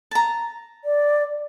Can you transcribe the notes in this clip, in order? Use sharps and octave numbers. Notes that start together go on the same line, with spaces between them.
A5 A#5
D5